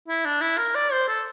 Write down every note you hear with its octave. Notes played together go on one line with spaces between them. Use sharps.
E4
D4
E4
A#4
D5
C5
A4